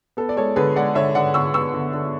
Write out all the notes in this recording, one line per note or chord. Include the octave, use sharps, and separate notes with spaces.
B3 A4
D5
G#3 A4 C#5
D3 G#4 B4
G#3 D5 F#5
D3 C#5 E5
D3 D5 F#5
D3 C#6 E6
B3 C#6 E6
D3
D3